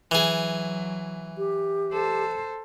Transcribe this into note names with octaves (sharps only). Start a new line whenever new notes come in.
E3 F#3 G#4
G4
A4 C5